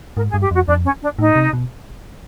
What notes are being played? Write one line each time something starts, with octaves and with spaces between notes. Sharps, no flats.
G#2 A#4
G#4
G2
G4
F2 F#4
F2 D4
C#4
D4
A2 D#4
C3
B2